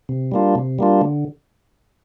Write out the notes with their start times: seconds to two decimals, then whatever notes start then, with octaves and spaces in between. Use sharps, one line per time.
0.09 C3
0.32 G3 A#3 D4 F4
0.55 C3
0.79 G3 A#3 D4 F4
1.01 D3